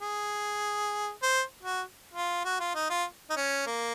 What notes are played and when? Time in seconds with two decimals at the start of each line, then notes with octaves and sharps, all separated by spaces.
0.01 G#4
1.23 C5
1.63 F#4
2.14 F4
2.44 F#4
2.60 F4
2.75 D#4
2.90 F4
3.30 D#4
3.36 C#4
3.67 A#3